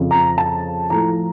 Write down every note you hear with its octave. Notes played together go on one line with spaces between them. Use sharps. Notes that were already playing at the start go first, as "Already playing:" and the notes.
Already playing: F2 C#3 F3
A#5
A5
A2 F3 A3 A#5